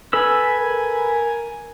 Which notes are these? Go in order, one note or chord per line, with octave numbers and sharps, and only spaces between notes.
A4 B4 G#5 E6
A#4